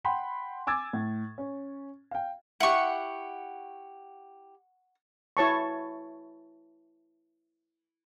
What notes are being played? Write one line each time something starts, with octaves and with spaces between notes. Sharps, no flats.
F#5 G5 B5 C6
G#5 D6 E6 G#6 A6
A2
C#4
F5 G5
E4 G4 F#5 C#6
E4 C#5 A5 C#6